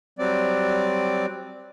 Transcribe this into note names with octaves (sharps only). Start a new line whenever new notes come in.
F#3 G3 C4 D5